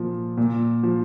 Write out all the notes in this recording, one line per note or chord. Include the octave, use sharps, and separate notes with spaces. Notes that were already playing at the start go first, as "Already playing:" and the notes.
Already playing: A#2 F3
A#2
F3